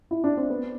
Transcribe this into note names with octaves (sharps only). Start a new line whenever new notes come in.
E4
D4
C4
B3